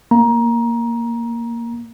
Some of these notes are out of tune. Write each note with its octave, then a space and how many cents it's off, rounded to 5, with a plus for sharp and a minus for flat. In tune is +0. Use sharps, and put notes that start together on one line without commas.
A#3 +0 A#5 +20